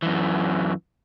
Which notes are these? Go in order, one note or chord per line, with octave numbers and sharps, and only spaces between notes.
F#2 E3